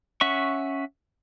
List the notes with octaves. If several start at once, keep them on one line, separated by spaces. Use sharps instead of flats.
C#4 E5 F#5 C#6